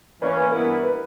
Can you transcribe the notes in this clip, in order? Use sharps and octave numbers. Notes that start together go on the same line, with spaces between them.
E3 A#3 C#4 B4 D5
B4
G2 E3 B3 E4 A#4
B4